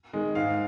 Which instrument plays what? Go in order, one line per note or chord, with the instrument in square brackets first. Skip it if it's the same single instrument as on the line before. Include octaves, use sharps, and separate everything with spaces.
[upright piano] D#3 G#3
G#2 F5